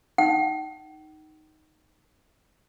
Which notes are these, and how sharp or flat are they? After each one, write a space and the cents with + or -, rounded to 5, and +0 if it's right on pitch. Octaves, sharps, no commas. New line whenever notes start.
D#4 +0 G5 -45